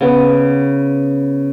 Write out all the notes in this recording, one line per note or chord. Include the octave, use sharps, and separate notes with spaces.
C#3 B3